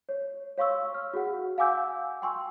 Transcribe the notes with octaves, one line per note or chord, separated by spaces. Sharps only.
C#5
C#5 F5 C6 C#6 E6
F6
F#4 G#4 F#5
F5 F#5 G#5 D6 E6 G6
G5 G#5 C6 C#6 E6